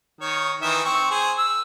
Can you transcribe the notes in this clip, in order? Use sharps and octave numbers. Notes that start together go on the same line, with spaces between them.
D#3 C#5
D#3 E3 E5
C4 C#6
G#4 C5
E6